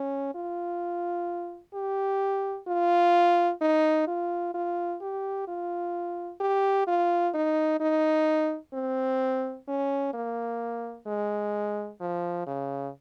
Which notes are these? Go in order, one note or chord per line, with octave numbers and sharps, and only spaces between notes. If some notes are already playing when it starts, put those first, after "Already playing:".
Already playing: C#4
F4
G4
F4
D#4
F4
F4
G4
F4
G4
F4
D#4
D#4
C4
C#4
A#3
G#3
F3
C#3